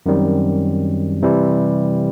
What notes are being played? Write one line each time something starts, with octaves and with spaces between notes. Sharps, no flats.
F#2 D#3 G3 C4
C3 E3 G3